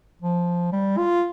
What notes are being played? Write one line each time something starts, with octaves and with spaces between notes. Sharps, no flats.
F3
G3
F4